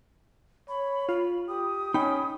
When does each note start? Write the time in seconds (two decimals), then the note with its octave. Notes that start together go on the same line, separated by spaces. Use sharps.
0.69 C#5 B5
1.09 F4 B5
1.48 G4 D#6
1.94 C#4 D#4 G5 B5